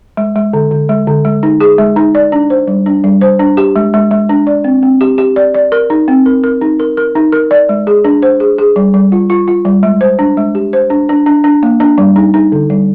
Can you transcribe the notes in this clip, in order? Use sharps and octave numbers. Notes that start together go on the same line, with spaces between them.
G#3
G#3
D3
D3
G#3
D3
G#3
D#4
G#4
G#3
D#4
D5
D4
C5
G3
D4
G3
C5
D4
G4
G#3
G#3
G#3
D4
D5
C4
C4
G4
G4
D5
D5
A#4
D#4
C4
A#4
A#4
D#4
A#4
A#4
D#4
A#4
D5
G#3
G#4
D4
C5
G#4
G#4
G3
G3
F4
F4
F4
G3
G#3
C5
D4
G#3
G4
C5
D4
D4
D4
D4
A#3
D4
G3
D#4
D#4
D3
G3